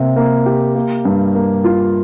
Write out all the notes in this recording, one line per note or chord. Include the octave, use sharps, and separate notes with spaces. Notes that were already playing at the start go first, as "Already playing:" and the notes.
Already playing: C3 A#3
A#3
G4
A#3
G2
A#3
F4